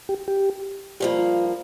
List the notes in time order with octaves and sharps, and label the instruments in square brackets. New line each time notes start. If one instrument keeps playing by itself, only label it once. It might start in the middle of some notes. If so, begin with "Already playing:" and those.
[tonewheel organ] G4
G4
[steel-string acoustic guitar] G2 F3 A#3 [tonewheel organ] G4
[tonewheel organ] F4